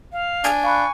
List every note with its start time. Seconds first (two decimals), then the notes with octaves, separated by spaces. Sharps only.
0.12 F5
0.44 D4 G#5
0.64 F5 B5 C#6 F#6